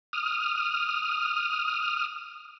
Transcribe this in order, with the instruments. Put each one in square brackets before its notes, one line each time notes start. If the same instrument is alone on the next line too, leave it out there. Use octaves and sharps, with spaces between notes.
[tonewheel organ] D#6 F6